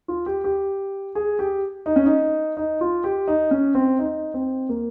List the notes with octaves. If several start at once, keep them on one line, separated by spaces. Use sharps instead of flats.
F4
G4
G4
G#4
G4
D#4
C#4
D#4
D#4
F4
G4
D#4
C#4
C4
D#4
C4
A#3